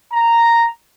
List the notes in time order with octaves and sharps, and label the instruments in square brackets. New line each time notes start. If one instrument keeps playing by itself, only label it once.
[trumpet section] A#5